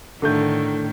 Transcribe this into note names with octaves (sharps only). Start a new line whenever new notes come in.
A2 D3 D#3 A3 G6